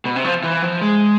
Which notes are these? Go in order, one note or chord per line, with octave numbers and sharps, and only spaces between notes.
B2
C3
F3
E3
F3
G#3